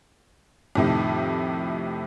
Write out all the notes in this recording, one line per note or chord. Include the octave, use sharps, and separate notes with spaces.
F2 A2 C3 D#3